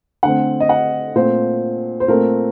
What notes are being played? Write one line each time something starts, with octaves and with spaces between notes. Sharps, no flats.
D3 A3 C4 F#5
D#5
F#5
A#2 A3 C4 C5
C5
A#2 A3 C4 A#4